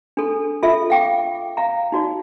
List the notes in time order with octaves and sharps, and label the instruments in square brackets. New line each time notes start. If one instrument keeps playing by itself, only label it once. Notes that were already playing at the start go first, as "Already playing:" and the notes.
[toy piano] D4 A4
F4 A4 E5
F5 G5 D6
F5 A#5
D#4 F#4 D5